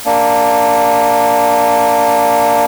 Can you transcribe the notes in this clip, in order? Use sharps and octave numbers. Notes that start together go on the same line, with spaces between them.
A#3 D4